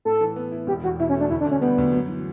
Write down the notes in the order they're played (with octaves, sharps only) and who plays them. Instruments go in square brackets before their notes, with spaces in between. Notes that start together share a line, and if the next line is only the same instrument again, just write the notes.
[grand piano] A2 [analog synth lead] A4
[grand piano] E3
B3
E4
[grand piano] E1 [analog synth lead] G4
[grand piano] E2 [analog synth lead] F#4
[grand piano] B2 [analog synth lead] E4
[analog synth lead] C#4
[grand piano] A3
[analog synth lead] D4
[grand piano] D2 [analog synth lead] E4
[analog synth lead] D4
[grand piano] D3 [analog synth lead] C#4
[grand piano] G3 [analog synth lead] B3
[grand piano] D2
F#2
E3